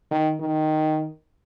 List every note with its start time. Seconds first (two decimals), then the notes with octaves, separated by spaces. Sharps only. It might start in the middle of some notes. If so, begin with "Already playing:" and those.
0.11 D#3
0.40 D#3